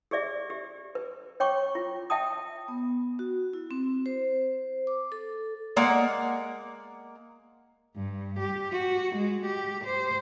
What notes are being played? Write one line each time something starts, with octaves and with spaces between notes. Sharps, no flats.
G4 G#4 D5 E5
G4
B4
C#5 G5 C#6 D6
F4
E5 G5 A5 D#6
B3
F#4
E4
C4
C5
D6
A4
G#3 A#3 D5 F#5
G2
G4
F#4
G#3
G4
C5